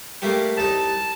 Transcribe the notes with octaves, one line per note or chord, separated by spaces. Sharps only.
G3 A3 A#3
C2 D#4 A5